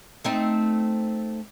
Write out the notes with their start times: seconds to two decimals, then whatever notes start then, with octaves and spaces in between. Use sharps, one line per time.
0.24 A3 C4 D#4